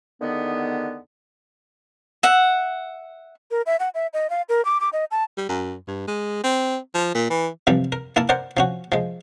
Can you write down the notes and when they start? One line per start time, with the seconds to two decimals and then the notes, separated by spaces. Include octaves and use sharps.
0.21 E2 D3 D#3 B3
2.23 E5 F#5
3.51 A#4
3.66 E5
3.80 F#5
3.95 E5
4.14 D#5
4.30 F5
4.49 A#4
4.65 D6
4.81 D6
4.93 D#5
5.11 A5
5.37 G3
5.49 F#2
5.88 G2
6.08 G#3
6.44 C4
6.94 F3
7.15 A#2
7.30 E3
7.67 C3 E3 F3 G3
7.92 A#4
8.16 A#3 E4 A#4 A5
8.29 A#4 C5 D5 F#5
8.57 F3 C#4 F#4
8.92 F3 G#3